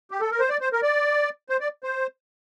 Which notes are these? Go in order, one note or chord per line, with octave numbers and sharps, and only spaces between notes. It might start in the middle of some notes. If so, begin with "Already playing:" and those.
G4
A4
A#4
C5
D5
C5
A#4
D5
C5
D5
C5